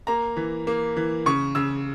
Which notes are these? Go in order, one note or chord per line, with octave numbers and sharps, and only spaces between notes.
A#3 A#5
E3
A#3
E3
C#3 C#6
C#3 E6